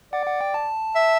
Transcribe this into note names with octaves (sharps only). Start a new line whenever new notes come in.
D5 F#5
F#5
G5
A5
E5